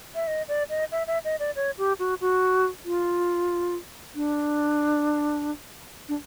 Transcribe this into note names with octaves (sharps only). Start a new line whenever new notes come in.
E5
D#5
D5
D#5
E5
E5
D#5
D5
C#5
G4
F#4
F#4
F4
D4
D4